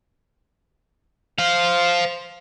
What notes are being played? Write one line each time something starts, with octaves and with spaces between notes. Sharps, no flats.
C5 F5